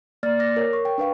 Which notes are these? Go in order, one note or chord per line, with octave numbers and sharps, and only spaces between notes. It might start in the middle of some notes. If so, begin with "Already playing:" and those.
A#3 D5 F6 A6
D6 F6 A#6
A#4 C#5
C#6
G5
D4 B4 F5 C#6